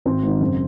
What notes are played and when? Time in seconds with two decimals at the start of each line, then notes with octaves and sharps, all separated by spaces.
0.05 G#1 C4
0.23 G#2 D#3
0.40 F#1